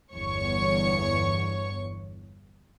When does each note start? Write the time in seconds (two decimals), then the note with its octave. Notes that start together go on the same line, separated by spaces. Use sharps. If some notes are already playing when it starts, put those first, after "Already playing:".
0.14 G1 E2 C#5 C#6